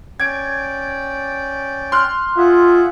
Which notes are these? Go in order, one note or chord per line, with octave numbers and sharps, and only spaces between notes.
C#4 D5 G5 G#6 D7
C6 F6 F#6
F4 G#4 E5 F#5